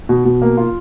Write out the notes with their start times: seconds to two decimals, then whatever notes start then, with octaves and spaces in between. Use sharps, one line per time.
0.09 B2
0.25 B2
0.42 A#3
0.57 F4